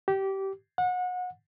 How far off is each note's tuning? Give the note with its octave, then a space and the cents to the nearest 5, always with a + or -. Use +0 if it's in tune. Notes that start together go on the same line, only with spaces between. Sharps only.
G4 -20
F#5 -30